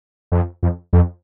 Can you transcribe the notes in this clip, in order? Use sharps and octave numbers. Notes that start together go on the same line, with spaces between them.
F2
F2
F2